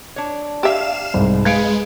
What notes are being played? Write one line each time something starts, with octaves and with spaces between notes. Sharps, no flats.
D4 C#5
G4 E5 F5 E7
C2 G#2
G#3 B4 F5 G#6 C#7 D7